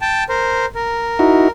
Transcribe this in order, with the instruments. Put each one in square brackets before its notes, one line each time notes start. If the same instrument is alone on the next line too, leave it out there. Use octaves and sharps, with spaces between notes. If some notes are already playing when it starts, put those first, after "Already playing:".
[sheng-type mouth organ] G5 A5
A#4 C5
A#4
[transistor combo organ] D#4 E4 F#4